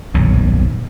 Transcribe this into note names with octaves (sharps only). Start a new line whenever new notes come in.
D#1 B1 F#2